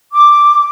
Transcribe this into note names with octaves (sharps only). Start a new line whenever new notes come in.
D6